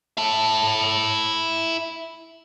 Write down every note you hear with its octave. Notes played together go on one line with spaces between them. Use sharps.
E4 A5